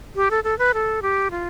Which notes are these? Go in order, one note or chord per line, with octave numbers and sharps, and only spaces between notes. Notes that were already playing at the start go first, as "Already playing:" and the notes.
G4
A4
A4
B4
A4
G4
F4